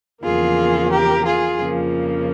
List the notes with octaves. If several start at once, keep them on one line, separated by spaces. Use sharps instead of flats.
E2 C#3 F3 A#3 F4 G#4
G4 A#4
F4 G#4
F2 C#3 F3 A#3